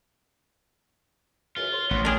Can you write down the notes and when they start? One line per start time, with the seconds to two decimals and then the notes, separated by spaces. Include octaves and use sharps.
1.57 C#2 F#2 F4
1.73 C#5 C6
1.91 A1 B3 C4
2.05 D4 G#4 A#4 C#5 G5